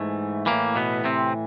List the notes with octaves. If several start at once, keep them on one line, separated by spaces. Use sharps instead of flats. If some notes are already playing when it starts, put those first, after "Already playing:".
Already playing: G#2 E3 A3
A2 E3 A#3
B2 B3
C3 C4